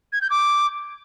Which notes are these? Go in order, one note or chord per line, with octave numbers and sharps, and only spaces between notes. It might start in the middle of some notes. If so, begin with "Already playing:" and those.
G#6
G6
D6